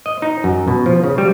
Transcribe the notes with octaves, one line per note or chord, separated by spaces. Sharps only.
D#5
D#4
F#2
B2
F3
C#3
G3